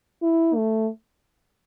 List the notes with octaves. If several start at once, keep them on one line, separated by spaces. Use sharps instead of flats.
E4
A3